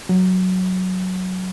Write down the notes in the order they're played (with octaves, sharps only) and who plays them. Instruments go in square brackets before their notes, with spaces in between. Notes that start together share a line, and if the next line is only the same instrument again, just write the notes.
[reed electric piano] F#3